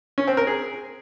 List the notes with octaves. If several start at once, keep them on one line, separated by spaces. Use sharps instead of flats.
C#4
C4
A#4
G#4